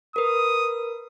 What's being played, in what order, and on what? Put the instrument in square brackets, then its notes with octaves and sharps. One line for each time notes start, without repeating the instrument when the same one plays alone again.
[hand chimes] A#4 B4 [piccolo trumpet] D#6